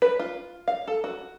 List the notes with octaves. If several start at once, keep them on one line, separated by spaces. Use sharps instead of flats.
B4
F4
F5
A4
F#4